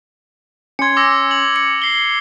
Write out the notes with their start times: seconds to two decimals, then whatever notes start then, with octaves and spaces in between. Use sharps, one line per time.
0.79 C#4 C6 G#6 C#7
0.97 D6 E6 A#6
1.31 F#7
1.56 C#7
1.82 C7 G7